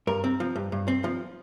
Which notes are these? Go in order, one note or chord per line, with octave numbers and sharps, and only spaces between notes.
G2 A#4
C4
F3
G2
G2
C4
F3